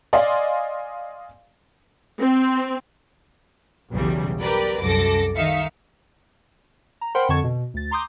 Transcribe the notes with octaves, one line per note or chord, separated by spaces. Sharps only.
D5 D#5 F5 G#5 C6
C4
B1 E2 C#3 G3
G4 A#4 B4 D5
C2 F#2 A4 D6 A#6
D#3 D#4 E5 F5 C#7
A#5
A#4 C5 F#5 G5 B5 C6
F2 D3 F#5 A5 C#6 G#6
B2
D2 A6
A#5 C6 D6 D#6 G6